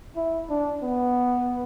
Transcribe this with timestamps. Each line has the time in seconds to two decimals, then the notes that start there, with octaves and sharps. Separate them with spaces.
0.16 E4
0.49 D4
0.83 B3